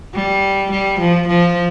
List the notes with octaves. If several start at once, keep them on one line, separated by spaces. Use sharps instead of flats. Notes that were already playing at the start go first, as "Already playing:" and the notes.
G3
G3
F3
F3